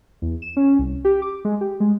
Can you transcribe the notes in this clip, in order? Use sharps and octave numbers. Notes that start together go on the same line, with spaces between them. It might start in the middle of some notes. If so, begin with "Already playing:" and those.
E2
E7
C#4
C2
G4
D6
G#3
G4
G#3